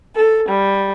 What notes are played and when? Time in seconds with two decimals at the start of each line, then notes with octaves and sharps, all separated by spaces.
0.16 A4
0.48 G3